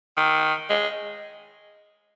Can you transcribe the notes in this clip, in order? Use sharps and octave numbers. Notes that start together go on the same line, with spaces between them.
D#3
G#3